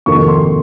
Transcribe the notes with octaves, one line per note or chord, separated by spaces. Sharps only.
F2 C3 D#3 A#3 D#4 C#6
C6